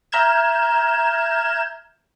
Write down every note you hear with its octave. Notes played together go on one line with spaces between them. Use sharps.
E5 A#5 F6 G6 G#6 E7